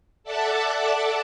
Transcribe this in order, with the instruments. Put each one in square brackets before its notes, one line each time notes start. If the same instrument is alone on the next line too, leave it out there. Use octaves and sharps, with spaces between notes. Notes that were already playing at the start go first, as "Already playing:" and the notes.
[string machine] A4 D5 E5 F#5 A5 D6